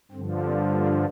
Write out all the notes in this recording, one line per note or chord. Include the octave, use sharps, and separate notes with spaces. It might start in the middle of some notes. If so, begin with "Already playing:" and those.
G2 D3 F3 C4
C4
A#3 D4